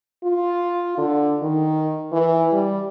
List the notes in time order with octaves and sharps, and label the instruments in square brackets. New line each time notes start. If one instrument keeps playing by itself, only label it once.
[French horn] F4
D3
D#3
E3
G3